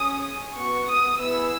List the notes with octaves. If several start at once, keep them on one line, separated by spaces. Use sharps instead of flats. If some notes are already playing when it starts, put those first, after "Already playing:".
Already playing: C#4 G#4 D#6
B3 F#4 C#6
D#6
B3 E4 G#4 E6